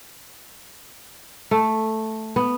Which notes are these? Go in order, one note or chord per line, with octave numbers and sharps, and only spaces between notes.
A3
B3